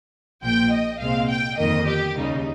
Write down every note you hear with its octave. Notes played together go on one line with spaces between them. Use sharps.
A#1 A#2 F3 G5
D#5
C2 A#2 G#3 C4 F5
G5
G1 F2 D#3 A#3 D#5
G4
D#2 C#3 G3 D#4